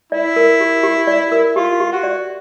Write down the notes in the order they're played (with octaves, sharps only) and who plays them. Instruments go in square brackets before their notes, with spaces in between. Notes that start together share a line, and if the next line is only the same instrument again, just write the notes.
[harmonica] E4 [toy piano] D5
[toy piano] A#4
G4
G4
D5
A#4
[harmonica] F4 [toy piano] G4
[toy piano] G4
[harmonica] F#4
[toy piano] D5